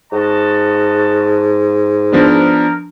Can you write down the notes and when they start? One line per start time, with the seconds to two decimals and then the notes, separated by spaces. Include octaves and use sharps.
0.12 G#2 F#4 D#5 A5
2.12 F3 B3 D4 A#4